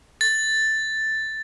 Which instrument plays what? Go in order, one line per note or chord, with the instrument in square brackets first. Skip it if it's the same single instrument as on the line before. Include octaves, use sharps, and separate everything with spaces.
[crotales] A6